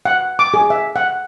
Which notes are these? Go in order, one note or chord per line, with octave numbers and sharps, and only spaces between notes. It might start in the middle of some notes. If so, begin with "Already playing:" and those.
F#5
D6
G#4
E5
F#5